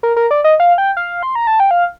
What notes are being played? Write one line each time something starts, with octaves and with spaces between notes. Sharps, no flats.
A#4
A#4
D5
D#5
F5
G5
F5
C6
A#5
A5
G5
F5